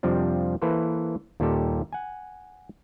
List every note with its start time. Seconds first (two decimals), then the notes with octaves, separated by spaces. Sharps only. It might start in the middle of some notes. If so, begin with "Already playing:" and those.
0.03 F2 C3 F3 G3 C4 D4
0.62 E3 A#3 A4 B4 C5
1.40 D#2 A#2 G3 G4 A4
1.93 F#5 G#5